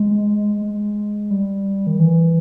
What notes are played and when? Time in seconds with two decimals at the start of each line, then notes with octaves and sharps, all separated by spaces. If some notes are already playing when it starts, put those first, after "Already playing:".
Already playing: G#3
0.62 G#3
1.30 G3
1.87 D#3
1.99 E3